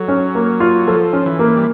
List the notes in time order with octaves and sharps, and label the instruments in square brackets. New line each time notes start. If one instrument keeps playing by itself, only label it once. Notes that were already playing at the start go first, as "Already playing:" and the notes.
Already playing: [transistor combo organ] F#3 [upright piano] A4
[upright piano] C#4
A#3
F4
[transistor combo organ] F3 [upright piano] A4
[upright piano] C#4
[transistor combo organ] E3
[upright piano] A#3
[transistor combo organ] G3